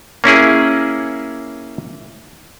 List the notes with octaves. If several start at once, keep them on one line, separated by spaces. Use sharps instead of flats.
A#3 C#4 E4 G#4